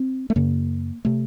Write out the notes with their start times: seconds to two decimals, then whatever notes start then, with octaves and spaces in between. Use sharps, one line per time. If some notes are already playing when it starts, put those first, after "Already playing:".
Already playing: C4
0.30 A3
0.36 F#2 C#3 A#3
1.05 C3 A3